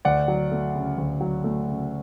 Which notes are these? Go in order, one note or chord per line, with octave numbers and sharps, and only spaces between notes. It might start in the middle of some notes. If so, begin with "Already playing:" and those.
D2 D5 F#5
F#3
A3
C#3
D2
F#3
A3
C#3